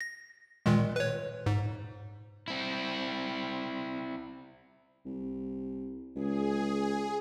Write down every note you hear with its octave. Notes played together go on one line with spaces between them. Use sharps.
A#6
A#2 D#3 G#3
B4 C#5
G#2
C4 E4
C2
C#2 G#4